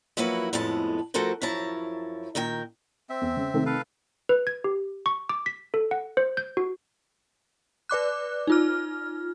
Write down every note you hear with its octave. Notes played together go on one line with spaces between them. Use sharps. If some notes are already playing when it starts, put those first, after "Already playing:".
F3 F#3 A#3 E4 F#4 B4
F2 A2 G#3 B3 A5
F3 A3 F#4 A4 A#4 C5
F#2 F3 E4 C#5 A5 A#5
A#2 D#3 A#4 G5
C4 E5
E2
C#3
C3 D#3 A3
A4 B4 F5
B4
G#6
G4
C#6
D6
B6
A4
F#5
C5
G6
F#4
B4 D5 D6 F#6
D#4 F4 F6